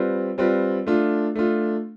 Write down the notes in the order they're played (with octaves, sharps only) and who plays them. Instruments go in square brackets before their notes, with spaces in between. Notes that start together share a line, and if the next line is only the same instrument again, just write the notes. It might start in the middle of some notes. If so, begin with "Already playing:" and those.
Already playing: [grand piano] G3 C4 F4 B4
G3 C4 F4 B4
A3 D4 F4
A3 D4 F4